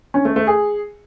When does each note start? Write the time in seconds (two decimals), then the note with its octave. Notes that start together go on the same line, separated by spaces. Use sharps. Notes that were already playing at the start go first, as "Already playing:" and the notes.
0.14 C#4
0.25 A3
0.36 A3
0.47 G#4